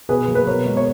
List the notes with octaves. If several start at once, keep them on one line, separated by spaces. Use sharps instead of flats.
B2 G#4 B4
F#3 A#3
B4
B2 A#4 C#5
G#3 B3
C#5